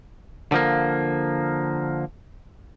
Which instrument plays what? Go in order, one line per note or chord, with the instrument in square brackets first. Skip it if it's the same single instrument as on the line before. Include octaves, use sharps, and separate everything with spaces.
[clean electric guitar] D3 F3 A#3